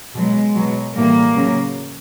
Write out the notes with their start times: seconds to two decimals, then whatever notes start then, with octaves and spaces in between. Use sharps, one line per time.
0.14 B2 F#3 G#3
0.55 B2 F#3
0.94 A2 E3 G3 A#3
1.34 C#3 F#3